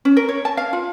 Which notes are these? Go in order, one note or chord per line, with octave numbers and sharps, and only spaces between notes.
C#4
A#4
C#5
A5
F5
F4